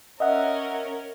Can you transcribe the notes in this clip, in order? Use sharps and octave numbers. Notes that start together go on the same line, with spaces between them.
C#4 A#4 D#5 E5 F#5